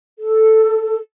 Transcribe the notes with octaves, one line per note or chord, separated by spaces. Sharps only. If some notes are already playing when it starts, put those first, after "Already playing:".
A4